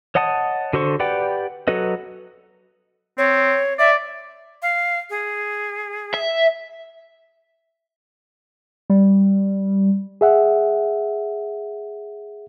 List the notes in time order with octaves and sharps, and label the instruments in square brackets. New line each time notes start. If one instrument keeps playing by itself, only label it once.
[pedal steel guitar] C#5 D#5 F#5 A5 D#6
D3 F#4 A4 C5 C#6
G4 B4 D5 F#5 G5
F#3 F#4 A4 B4 D#5
[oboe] C4 [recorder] C#5
[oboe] D5 [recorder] E5
[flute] F5
G#4
[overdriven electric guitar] E5
[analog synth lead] G3
[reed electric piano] G#4 E5 F#5